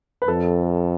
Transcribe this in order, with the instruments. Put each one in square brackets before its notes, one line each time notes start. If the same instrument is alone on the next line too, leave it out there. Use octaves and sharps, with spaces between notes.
[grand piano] B4
[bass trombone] F2 [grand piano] A4